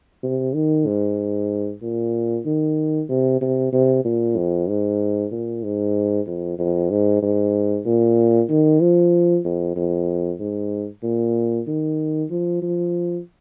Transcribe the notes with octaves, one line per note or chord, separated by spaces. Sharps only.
C3
D#3
G#2
A#2
D#3
C3
C3
C3
A#2
F2
G#2
A#2
G#2
F2
F2
G#2
G#2
A#2
D#3
F3
F2
F2
G#2
A#2
D#3
F3
F3